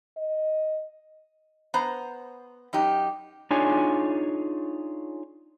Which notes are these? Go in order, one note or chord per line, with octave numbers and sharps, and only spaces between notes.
D#5
B3 C5 A#5
F#2 D#4 G4
D4 D#4 F4 G#4 C#5 G#5